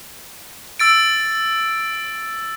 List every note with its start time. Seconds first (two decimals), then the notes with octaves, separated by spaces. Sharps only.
0.79 E6 A6 D7